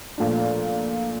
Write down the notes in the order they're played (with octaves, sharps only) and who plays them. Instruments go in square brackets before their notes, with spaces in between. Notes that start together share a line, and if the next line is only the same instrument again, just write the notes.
[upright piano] A#2 F3 A3 D4